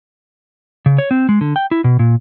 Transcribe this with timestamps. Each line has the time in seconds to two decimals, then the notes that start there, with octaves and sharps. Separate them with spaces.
0.86 C#3
0.98 C#5
1.11 C4
1.29 G#3
1.41 D3
1.56 G5
1.71 E4
1.84 B2
1.99 A#2